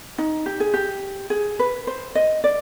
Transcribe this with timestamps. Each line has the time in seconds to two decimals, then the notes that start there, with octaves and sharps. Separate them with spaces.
0.18 D#4
0.46 G4
0.60 G#4
0.74 G4
1.30 G#4
1.59 B4
1.87 C5
2.15 D#5
2.44 D5